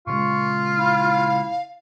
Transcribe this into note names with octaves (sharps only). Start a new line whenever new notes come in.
A#2 C#3 G#3 F4 C#6
E4 F5